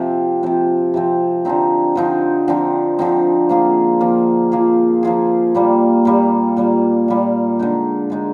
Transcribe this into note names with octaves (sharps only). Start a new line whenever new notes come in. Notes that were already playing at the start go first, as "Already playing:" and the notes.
Already playing: C3 F3 C4
C3 F3 C4
C3 F3 C4
D3 F3 C4 D#4
D3 F3 C4 D#4
D3 F3 C4 D#4
D3 F3 C4 D#4
F3 A#3 F4 G#4
F3 A#3 F4 G#4
F3 A#3 F4 G#4
F3 A#3 F4 G#4
A#2 G3 A#3
A#2 G3 A#3
A#2 G3 A#3
A#2 G3 A#3
D3 G#3 D#4
D3 G#3 D#4